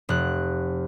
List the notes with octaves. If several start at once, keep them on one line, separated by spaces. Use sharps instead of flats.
F1 F#6